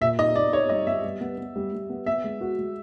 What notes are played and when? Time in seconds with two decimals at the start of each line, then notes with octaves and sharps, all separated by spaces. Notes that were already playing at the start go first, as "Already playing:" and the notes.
0.01 A#2 E5
0.19 D#4 D#5
0.35 D#4 D5
0.52 D#4 C#5
0.69 G3 D#5
0.87 B3 E5
1.04 G3
1.21 B3
1.38 B3
1.56 G3
1.73 G3
1.90 B3
2.06 B3 E5
2.24 G#3
2.41 F#4
2.59 G#3